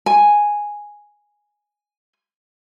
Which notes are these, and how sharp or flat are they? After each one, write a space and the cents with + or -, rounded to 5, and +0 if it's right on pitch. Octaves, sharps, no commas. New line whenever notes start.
G#5 +0